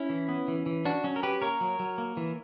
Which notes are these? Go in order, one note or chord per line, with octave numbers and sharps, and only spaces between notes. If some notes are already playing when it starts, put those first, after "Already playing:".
Already playing: C#4 E4
E3
B3
E3
E3
C#4 D4 F#4
F#3 C#4
A#4
C#4 G4 B4
A#3 A#4 C#5
F#3
F#3
A#3
E3